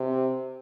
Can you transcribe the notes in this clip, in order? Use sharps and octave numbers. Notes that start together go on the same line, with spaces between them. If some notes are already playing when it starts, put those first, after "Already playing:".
Already playing: C3